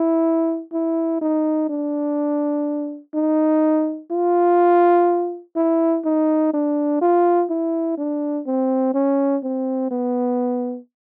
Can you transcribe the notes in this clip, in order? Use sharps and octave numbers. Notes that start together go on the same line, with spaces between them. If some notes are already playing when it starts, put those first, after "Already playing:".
Already playing: E4
E4
D#4
D4
D#4
F4
E4
D#4
D4
F4
E4
D4
C4
C#4
C4
B3